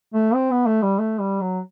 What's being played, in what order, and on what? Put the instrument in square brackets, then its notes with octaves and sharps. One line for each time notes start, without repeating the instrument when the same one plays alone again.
[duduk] A3
C4
B3
A3
G3
A3
G3
F#3